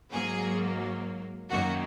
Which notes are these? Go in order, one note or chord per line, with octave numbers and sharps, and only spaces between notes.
G#2 F#3 A#3 G#4
F#2 D#3 F#3 A#3 F#4